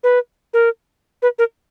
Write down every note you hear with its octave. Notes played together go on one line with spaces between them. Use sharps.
B4
A#4
B4
A#4